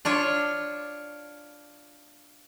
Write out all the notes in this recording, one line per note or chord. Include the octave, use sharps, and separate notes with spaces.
D4 F4 C#5